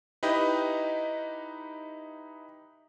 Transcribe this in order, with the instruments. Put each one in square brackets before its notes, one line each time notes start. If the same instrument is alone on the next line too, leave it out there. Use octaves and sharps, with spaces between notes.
[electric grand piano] D#4 E4 G4 B4 D#5